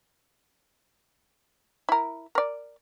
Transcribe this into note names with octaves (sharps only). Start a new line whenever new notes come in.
E4 A#4
A#4 D5